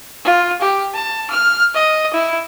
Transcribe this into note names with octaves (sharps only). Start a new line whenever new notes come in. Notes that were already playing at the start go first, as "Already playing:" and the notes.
F4
G4
A5
F6
D#5
E4